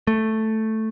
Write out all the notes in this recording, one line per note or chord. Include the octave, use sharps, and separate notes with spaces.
A3